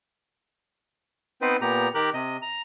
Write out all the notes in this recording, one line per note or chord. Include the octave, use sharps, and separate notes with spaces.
B3 C4 D#4 B4 C5
A#2 B3 G4 A#5
D#3 G4 A#4 F#6
C3 D#5
A#5